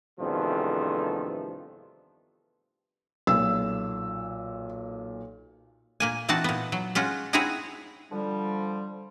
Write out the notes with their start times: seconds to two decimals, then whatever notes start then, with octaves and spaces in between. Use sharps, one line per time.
0.20 E2 G2 C3 D#3 F3 A3
3.27 B1 A#2 E6
6.00 A#2 A#3 G#5
6.28 E3 C4 D#4 F#4 A5
6.44 A#2 B3
6.72 F#3
6.95 G#3 C#4 F4 F#4
7.33 C4 D#4 E4 F#4 G#4 C#5
8.12 D3 F3 G3